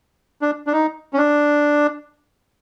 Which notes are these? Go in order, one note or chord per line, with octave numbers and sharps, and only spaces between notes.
D4
D4
D#4
C#4
D4